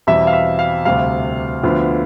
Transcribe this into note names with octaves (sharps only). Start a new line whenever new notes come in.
E2 B2 G3 C4 E4 E5
F5
E5
F5
D2 C3 G3 F5
D2 D3 F3 B3